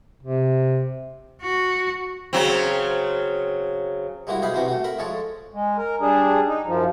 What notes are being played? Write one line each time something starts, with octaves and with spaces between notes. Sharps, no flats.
C3
F#4
C#3 F#3 C4
G3 G#3 A#3 E4 F#4
B1 D#4 E4 G#4 F5 B5
C3 E3 C4 C#4 F#4
A3 F#4
A#4 E5 B5
F3 G#3 A4 C#5
G#3
A#4
G3 D4 G#4
D#4
F#2 F3